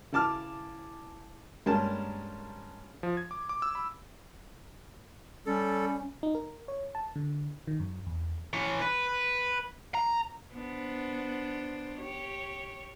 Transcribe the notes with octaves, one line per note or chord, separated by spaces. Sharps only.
C#3 E3 A5 D6 F6
G2 G#3 A#3 C#4 A#4 A5
F3
G#6
D6
D6
E6
B5
G3 C#4 A4
D#4
A#4
C#5
A5
D3
D#3
F#2
E2
E3 C#5
B4
A#5
B3 D4 C5
G4 C#5